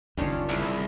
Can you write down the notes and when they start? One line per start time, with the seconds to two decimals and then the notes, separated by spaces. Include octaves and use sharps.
0.17 F#1 D2 D#3 G3 C#4 D4 F4
0.49 C2 E4 G#4